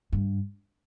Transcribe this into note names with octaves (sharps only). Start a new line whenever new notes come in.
G2